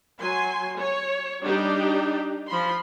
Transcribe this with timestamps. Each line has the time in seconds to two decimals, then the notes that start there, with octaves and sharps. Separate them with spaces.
0.18 F#3 G#5 C6
0.77 C#5
1.42 G3 D4 D#4 G4
2.47 F3 B5 C6